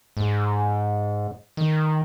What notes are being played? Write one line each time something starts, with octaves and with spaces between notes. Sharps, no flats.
G#2
D#3